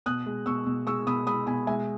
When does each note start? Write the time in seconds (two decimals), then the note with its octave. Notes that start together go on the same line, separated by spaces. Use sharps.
0.06 B2 D#6 F#6
0.26 G#3
0.46 B2 C#6 E6
0.66 B2
0.87 G#3 C#6 E6
1.07 B2 B5 D#6
1.26 G#3 B5 D#6
1.47 B2 G#5 B5
1.67 G#3 E5 G#5